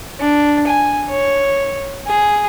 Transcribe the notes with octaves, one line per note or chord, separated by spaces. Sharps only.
D4
G#5
C#5
G#4